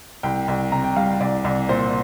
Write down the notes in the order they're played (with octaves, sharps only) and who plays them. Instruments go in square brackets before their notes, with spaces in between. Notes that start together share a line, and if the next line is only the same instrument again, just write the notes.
[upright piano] C2 G5
C2
C3 A#5
G5
G3 F5
C2 D5
C2
A#2 C5